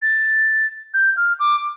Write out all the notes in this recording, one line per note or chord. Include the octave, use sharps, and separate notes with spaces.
A6
G6
F6
D6